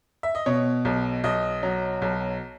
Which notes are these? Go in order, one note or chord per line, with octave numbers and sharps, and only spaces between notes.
E5
D#5
B2 C#5
B1
B1 D#5
F#3
B1